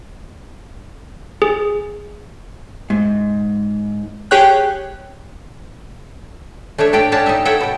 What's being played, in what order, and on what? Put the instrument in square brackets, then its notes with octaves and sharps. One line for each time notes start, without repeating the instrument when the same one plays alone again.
[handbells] G#4
[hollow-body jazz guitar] G#2
[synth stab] G4 G#4 C#5 G5 F#6
[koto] A3 D4 C#5 E5
A2 D4 G4 D5 G5
C#4 D4 G4 C#5 F#5 A5
D#4 G4 D#5 E5
A4 C#5 E5 F#5 G5
B2 G5